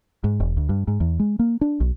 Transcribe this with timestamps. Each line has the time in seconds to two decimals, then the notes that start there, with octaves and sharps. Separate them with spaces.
0.24 G#2
0.40 E1
0.57 D2
0.69 G2
0.88 G#2
1.00 E2
1.19 G#3
1.39 A#3
1.61 D4
1.80 B1